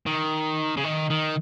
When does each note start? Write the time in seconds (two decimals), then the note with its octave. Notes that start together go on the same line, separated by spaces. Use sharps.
0.06 D#3
0.76 C#3
0.84 D#3
1.10 D#3